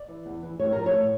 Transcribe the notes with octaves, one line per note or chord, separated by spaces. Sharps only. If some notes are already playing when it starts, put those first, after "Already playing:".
Already playing: D5
E3
E2
E3
A2 C#5
F3 A#4
C#5
A2